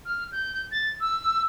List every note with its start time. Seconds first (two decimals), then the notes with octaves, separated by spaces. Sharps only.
0.06 F6
0.32 G6
0.72 A6
1.00 E6